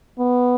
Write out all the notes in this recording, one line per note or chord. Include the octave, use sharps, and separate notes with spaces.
B3